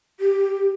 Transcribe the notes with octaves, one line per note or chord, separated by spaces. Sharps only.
G4